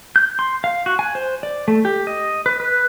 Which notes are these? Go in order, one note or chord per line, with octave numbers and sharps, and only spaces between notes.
G6
C6
F5
F#4
G#5
C5
D5
A3
G4
D#5
B4
B4